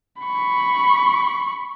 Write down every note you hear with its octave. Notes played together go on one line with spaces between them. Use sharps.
B5 C#6